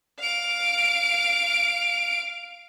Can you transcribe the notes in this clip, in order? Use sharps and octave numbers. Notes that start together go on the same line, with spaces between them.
F5 D7